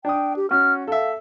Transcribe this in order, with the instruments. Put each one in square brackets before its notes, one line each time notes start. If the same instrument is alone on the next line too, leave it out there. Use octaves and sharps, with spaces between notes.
[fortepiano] D4 D#6 [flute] G5
[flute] G4
[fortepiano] C#4 F#4 [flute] F6
[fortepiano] A4 E5 [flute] F5